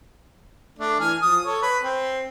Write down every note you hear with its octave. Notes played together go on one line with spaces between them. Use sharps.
A3 D4
E3 G#5 F6
F3 D#6
A4 C#5
B4
C4